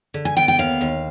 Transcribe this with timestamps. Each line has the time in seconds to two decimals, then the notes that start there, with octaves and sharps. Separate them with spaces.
0.14 D3
0.25 G#5
0.37 B3 G5
0.48 G5
0.58 D#2 F5
0.81 D#2